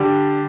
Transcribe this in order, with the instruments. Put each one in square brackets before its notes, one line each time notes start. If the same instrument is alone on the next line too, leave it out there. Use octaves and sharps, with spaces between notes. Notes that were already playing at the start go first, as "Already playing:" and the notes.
Already playing: [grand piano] D3 G3 D4 G4